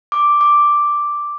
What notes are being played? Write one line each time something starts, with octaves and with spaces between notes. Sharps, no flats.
D6
D6